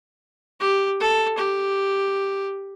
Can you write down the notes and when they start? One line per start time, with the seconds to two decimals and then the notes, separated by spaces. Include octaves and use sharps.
0.60 G4
1.00 A4
1.38 G4